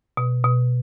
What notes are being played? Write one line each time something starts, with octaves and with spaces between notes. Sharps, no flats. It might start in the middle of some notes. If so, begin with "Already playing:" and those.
B2
B2